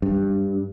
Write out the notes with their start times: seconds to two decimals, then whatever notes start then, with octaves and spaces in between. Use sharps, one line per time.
0.02 G2